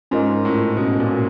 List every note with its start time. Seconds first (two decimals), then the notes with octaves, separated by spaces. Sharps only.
0.11 G#2 C#4 F4 A#4 D#5
0.45 A2
0.77 B2 C#4 F4 A#4 D#5
1.00 A#2